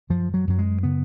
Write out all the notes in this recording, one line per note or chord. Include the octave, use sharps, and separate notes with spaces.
F#2 F3
F#3
F#2 F#3
G#3
C#3 B3